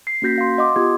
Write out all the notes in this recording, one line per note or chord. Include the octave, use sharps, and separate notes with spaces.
C7
A#3 C#4 F#4 G6 A#6 B6
F5 C6
D#5 F#5 C6 D6
B3 F4 G4 D6 D#6 G#6